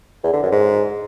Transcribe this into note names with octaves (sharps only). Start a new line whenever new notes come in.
E2
D3
F#2
G#2